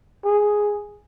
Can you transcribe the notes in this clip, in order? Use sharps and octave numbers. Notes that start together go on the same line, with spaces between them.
G#4